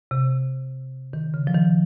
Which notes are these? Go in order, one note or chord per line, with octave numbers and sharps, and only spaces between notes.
C3
D#3
C#3
F3
D#3